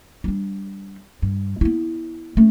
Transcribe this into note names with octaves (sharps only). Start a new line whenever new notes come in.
G3 D4
G2
B3 E4
A3 C#4